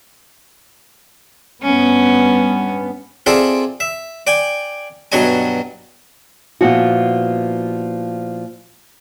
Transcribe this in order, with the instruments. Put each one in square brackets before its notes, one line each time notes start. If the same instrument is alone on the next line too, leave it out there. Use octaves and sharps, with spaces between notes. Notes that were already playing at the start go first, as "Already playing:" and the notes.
[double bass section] G2 B3 [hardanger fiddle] C#4
[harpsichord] C4 F4 G#4 A4 D5 E5
E5
D5 G5 G#5
G2 B2 F#3 C#5 D#5 G#5
[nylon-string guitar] A#2 F3 B3 E4 F#4